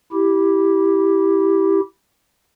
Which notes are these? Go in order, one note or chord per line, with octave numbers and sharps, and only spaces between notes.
E4 G4